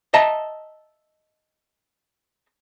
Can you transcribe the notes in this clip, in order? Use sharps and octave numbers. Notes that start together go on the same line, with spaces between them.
D#5 E5 A5 A#5